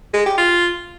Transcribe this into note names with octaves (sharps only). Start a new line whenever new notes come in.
G#3
G4
F4